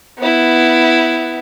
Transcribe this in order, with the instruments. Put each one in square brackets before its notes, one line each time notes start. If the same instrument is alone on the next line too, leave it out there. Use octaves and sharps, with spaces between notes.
[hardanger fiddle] B3 E4